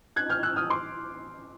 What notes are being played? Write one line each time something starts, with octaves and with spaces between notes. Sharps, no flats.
F#6 G#6
F6 G6
E6 F#6
D#6 F6
C6 D6